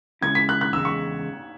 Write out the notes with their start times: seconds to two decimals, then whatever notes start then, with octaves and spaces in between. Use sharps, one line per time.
0.21 C#3 G#3 C#4 E4 G#6
0.35 B6
0.49 F#6
0.61 F#6
0.73 E2 C#3 G#3 E6
0.85 C#6